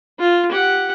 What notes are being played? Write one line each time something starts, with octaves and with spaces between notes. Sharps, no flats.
F4
G4 F#5